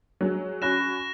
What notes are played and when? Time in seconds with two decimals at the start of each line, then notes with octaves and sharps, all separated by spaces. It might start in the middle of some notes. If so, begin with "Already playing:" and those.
0.21 F#3 G#3
0.62 C#4 F#4 B5 F#6 A#6 E7